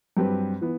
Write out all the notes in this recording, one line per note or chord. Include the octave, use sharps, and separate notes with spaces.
G2 F#3 C4 G4 B4
E3 B3